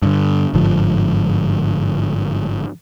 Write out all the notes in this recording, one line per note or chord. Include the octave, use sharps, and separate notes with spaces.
G2 D3
G1 G#2 D3 F3